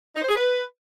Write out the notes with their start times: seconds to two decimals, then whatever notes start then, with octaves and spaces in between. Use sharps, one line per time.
0.15 D#4
0.22 C5
0.29 G#4
0.36 B4